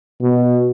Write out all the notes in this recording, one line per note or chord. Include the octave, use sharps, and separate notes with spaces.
B2